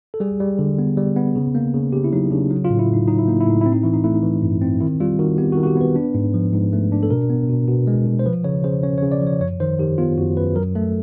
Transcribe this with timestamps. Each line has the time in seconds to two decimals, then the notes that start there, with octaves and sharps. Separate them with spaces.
0.14 A4
0.20 G3 G#4
0.40 G3
0.59 D3
0.79 B3
0.97 G3
1.16 B3
1.36 C#3
1.55 A#3
1.74 C#3
1.93 C#3 G4
2.04 E4
2.12 F#3 D#4
2.31 C#3 D4
2.50 F#3 D#4
2.65 F4
2.70 A2
2.79 E4
2.89 A2 D#4
3.07 F#3 D#4
3.19 E4
3.28 A#3 D#4
3.40 E4
3.46 A2 D#4
3.61 C4 E4
3.72 D#4
3.83 E3 E4
3.93 D#4
4.04 A3 E4
4.15 D#4
4.23 E3
4.42 G2
4.61 C4
4.80 D#3 E4
5.00 G3 F4
5.19 D#3 F#4
5.38 B3 G4
5.52 F#4
5.57 D#3
5.63 F#4
5.67 G4
5.77 B3 B4
5.96 D4
6.15 G#2
6.34 F3
6.53 G#2
6.73 A3
6.92 D4
7.03 A4
7.10 B2 A#4
7.30 B3
7.49 B2
7.68 B2
7.87 G#3
8.06 B2
8.19 C5
8.26 F3 B4
8.44 C#3 C#5
8.64 C#3 C5
8.83 C#4 C#5
8.98 C#5
9.02 C#3
9.12 D5
9.21 F3
9.27 C#5
9.40 F#2 C#5
9.60 D#3 C5
9.79 D#3 G4
9.98 B3 F4
10.17 F#2 F#4
10.37 F#2 B4
10.55 F#3 A#4
10.75 A3 A4